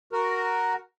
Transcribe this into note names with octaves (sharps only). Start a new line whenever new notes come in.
F#4 A#4